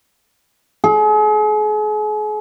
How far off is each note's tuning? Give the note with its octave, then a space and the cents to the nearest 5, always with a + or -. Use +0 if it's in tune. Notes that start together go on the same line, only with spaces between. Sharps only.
G#4 +40